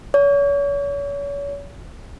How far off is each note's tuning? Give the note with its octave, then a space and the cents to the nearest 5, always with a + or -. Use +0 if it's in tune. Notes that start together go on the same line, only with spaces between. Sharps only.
C#5 +35